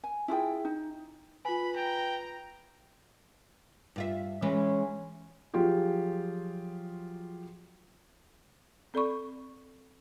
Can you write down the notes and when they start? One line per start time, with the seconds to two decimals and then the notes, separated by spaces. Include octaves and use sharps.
0.04 G#5
0.28 E4 F4 G#4 G5
0.65 D#4
1.45 F4 B4 G#5 B5
1.76 G5 A#5
3.96 G2 F4 E5
4.42 E3 G#3 C#4 B4
5.54 F3 F#3 F4 G4 G#4
8.94 C4 A4 D5 B5 C#6